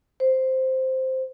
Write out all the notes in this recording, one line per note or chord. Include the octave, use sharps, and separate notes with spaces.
C5